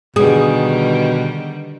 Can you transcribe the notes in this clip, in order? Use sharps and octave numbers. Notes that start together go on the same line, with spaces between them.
B2 D3 D#3 G3 G#4